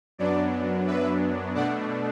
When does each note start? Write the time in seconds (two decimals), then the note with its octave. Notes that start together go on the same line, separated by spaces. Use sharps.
0.18 F#2 F#3 B3 D4 D5
0.87 B4 E5
1.55 B2 A3 D4 D5 F#5